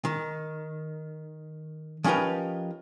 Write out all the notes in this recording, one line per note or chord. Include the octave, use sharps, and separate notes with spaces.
D#3
F3 C#4 D#4 G4 A#4 B4